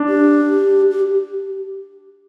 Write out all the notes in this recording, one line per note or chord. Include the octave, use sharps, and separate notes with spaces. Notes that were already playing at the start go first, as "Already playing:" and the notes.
Already playing: D4
G4
G4